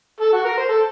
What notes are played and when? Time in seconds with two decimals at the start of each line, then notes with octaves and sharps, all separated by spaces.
0.20 A4
0.33 F#4
0.45 A#4
0.58 C5
0.69 A4